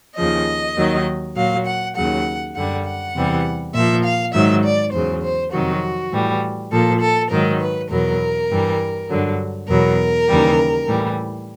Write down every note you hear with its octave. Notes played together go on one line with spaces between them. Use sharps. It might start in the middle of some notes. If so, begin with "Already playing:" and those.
D#2 C#3 F3 D#5
D#2 D#3 F#3
A#2 F#3 F5
F#5
D#2 C#3 F#3 F#5
F#2 D3 G3 F#5
F#5
E2 C3 E3 G3
A#2 F3 E5
F5
G#2 D#3 F#3 E5
D5
E2 C#3 F#3 C5
C5
F2 C3 D#3 F#3 F#4
A2 E3 G3
A#2 F3 A4
A4
G#2 D#3 F#3 A#4
B4
E2 B2 F#3 A#4
G2 E3 G3
G2 D3 F#3
E2 B2 F#3 A#4
D#2 C#3 E3 G3
A2 E3 G3